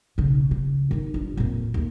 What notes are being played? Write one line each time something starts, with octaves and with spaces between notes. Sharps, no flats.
B1 C#3
C#3
D#3 D#4
G2 F4
F2 A#2
D#2 A3